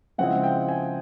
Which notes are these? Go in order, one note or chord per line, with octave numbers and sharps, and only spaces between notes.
C#3 F3 G#3 C4 E4 F#5
G5
G#5